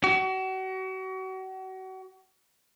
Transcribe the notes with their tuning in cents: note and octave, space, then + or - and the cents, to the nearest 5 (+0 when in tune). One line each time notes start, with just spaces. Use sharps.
F#4 +35